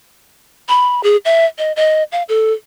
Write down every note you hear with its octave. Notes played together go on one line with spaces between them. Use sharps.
B5
G#4
E5
D#5
D#5
F5
A4